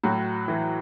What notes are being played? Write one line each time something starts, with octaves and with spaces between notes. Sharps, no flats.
A2 F#3 F#4
E3